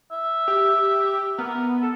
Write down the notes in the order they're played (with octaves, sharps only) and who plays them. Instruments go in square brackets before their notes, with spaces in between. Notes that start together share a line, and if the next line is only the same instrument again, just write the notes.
[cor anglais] E5
[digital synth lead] G4
[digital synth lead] B3 [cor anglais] A#4
[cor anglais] A4